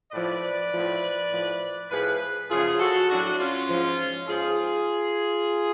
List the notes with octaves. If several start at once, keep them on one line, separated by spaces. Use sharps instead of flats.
A2 F3 B4 D5
A2 F3
A2 F3
A2 F3 G#4 B4
F#2 C#3 F3 F4 G#4
F#4 A4
A2 F#3 D4 F#4
C#4 F4
G#2 F3
G#2 F3 F4 G#4